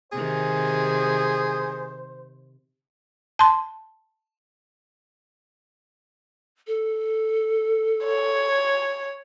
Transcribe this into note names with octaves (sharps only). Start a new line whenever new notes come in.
C3 D#3 G#4 C5
A5 C6
A4
C#5